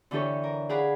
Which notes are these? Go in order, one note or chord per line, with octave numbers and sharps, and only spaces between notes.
D3 E3 D4 G4 A4 C#5
A#4
G#4 D5 F5 F#5 B5